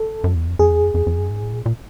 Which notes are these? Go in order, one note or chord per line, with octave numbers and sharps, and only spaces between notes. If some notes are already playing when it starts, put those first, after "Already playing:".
Already playing: A4
F#2
E2
F2
F2 G#4
E2
F2
F2
F2
F#2
G#2
A2
A#2
A#2